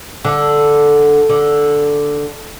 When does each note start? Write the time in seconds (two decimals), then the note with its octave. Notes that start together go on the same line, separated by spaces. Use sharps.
0.25 D3
1.29 D3